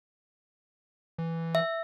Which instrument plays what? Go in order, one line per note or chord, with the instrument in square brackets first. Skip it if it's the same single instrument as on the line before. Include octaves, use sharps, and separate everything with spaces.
[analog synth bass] E3
[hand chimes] E5